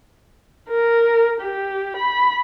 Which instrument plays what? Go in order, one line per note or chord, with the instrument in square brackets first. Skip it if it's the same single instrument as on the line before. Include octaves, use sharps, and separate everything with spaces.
[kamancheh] A#4
G4
B5